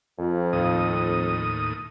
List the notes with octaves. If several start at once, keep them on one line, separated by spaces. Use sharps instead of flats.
F2
D#2 A2 D#6